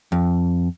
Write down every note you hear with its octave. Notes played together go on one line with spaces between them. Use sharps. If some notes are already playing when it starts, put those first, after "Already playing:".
F2